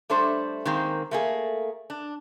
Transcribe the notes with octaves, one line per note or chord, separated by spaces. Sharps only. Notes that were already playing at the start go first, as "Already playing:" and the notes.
G3 A3 D4 C5
D#3 G#3 A#3 C4
A3 A#3 G#4
D4